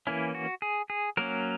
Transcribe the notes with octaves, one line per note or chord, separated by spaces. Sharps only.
E3 A#3 C#4 E4
F#4
G#4
G#4
F#3 A#3 C#4 A#4